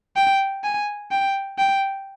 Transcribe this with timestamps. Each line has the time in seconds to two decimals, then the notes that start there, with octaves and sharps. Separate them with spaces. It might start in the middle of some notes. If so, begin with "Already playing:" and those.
0.17 G5
0.64 G#5
1.11 G5
1.58 G5